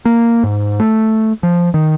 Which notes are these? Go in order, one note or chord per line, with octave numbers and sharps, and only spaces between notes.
A#3
G#2
A3
F3
D#3